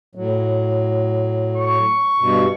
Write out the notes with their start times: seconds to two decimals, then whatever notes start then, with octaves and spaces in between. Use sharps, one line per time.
0.15 A2 F#3
1.57 C#6
2.20 G2 B2